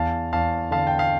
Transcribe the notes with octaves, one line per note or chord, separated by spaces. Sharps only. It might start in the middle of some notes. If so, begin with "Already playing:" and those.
Already playing: E2 F5 A5
E2 F5 A5
D3 F5 A5
G5
F5